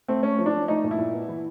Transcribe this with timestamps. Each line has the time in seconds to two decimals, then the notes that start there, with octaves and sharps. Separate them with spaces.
0.08 A3 C4
0.23 A3 C#4
0.39 F3
0.46 D4
0.54 F3
0.68 A3 D#4
0.84 A#2
0.91 E4
0.98 A#2
1.14 B3
1.28 E3